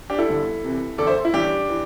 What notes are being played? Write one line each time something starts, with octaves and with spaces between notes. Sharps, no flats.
D4 G4
E4 A4
G1 G2 D3
C2 C3 E3
E1 D2 D3 A4 D5
C5 E5
E4
A1 G2 E3 D4 G4
E3